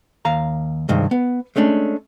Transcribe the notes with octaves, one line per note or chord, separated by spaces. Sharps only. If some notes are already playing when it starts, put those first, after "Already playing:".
D#2 F5 A#5
C2 G2 D#3 G#3
B3
G#3 A3 C#4 D4